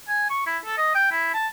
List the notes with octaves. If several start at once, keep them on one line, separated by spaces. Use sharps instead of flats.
G#5
C#6
E4
A4
D#5
G5
E4
A5